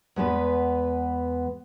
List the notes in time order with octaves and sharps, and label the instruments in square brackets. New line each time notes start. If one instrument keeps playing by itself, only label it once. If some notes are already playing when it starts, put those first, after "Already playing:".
[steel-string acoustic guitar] E2 G#3 B3 B4